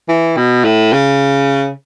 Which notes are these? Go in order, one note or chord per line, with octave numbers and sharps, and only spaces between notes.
E3
B2
A2
C#3